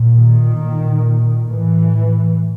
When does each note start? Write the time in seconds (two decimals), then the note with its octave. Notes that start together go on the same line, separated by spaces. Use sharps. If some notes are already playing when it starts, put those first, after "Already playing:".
Already playing: A#2
0.18 D#3
0.62 A#2
1.50 A2 E3